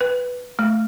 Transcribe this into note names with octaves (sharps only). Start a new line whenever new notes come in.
B4
A3